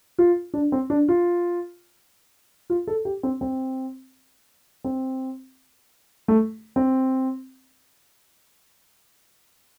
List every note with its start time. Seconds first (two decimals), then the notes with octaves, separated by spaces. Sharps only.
0.18 F4
0.54 D4
0.72 C4
0.90 D4
1.08 F4
2.70 F4
2.87 A4
3.05 G4
3.23 C4
3.41 C4
4.84 C4
6.28 A3
6.76 C4